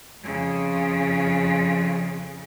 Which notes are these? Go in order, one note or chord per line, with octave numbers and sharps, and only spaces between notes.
F2 C#3